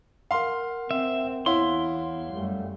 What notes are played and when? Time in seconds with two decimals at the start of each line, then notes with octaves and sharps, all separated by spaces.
0.31 A#4 F5 F#5 C6
0.91 C4 E5
1.46 E2 E4 C#5 F5 F#5 C6
2.31 F#2 G3 A3